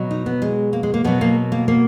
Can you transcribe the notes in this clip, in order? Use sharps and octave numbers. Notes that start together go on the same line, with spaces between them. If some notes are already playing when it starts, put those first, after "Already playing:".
Already playing: B2 F#3
D#4
B3
G#3
A#3
G#3
A#3
B2 F#3 B3
A#3
A#3
A#3